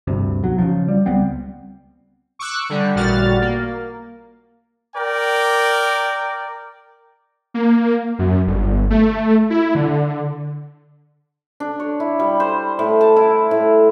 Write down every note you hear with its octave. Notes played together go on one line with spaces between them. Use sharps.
D2 G2 C3
B1 F#3
C#3 F3
G3
C#2 G3 B3 C4
C#6 D6 E6 F#6
D3 G3
A1 A#2 G3 F#4 F6 A6
A#3
A#4 D5 G5
A#3
F#2
G1
A3
E4
D3
D4
C#5
E4
G3
C5
A2
A5
E4
A2